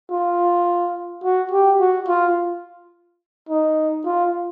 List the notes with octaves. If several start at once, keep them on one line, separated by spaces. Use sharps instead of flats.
F4
F#4
G4
F#4
F4
D#4
F4